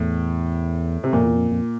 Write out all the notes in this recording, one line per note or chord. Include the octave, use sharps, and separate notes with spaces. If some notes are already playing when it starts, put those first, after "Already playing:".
Already playing: E2 A2
C3
F2 A#2
E2
F2
F2